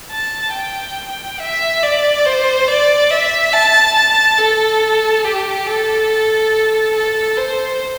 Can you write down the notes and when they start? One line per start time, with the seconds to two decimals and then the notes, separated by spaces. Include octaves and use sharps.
0.11 A5
0.54 G5
1.39 E5
1.83 D5
2.26 C5
2.68 D5
3.10 E5
3.53 A5
3.96 A5
4.38 A4
5.25 G4
5.67 A4
6.95 A4
7.37 C5